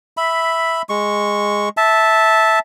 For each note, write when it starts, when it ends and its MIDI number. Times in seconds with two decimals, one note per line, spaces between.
0.17 0.82 76
0.17 0.82 83
0.89 1.69 56
0.89 1.69 85
1.77 2.59 76
1.77 2.59 81